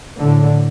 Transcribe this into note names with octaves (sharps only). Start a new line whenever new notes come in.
A2 D3